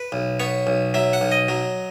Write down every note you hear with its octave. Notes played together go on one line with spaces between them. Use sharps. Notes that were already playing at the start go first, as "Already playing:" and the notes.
Already playing: B4
B1
B3 C#5
B1
F#3 E5
F#5
B1
D#5
F#3